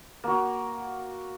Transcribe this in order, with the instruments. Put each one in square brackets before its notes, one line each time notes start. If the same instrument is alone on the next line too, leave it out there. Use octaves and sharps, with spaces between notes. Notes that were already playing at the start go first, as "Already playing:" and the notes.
[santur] A#3 F#4